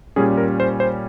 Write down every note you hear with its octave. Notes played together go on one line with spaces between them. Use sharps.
A#2 G3 C#4 G#4
A#4
C5
C5